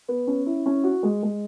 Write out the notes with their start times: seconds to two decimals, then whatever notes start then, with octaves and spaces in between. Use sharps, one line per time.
0.08 B3
0.27 C#4
0.46 E4
0.66 C#4
0.84 F#4
1.03 G#3
1.23 G#3